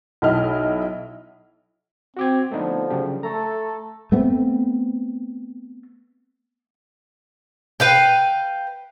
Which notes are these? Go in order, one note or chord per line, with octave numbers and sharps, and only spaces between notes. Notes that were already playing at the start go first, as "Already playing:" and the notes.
B1 E4 D#5 E5 F6
C4 F#4 D6 G#6
D3 F3 A3 B3 D#4
C#3 F#3 G4
A3 A4 A#5
A3 B3 C4
B4 F5 G5